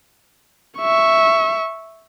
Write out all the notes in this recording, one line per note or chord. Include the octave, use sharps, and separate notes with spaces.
E5 C#6